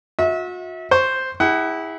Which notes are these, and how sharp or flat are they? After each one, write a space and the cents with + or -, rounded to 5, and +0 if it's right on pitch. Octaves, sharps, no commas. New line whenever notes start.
F#4 -40 E5 -30
C5 +0 C#6 +0
E4 -20 G#4 -30 F#5 +25